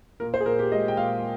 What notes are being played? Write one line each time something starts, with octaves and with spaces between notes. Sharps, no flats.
A#2 A#4
C5
G#4
A#2 A#4
G4
G#3 D#5
G5
A#2 F5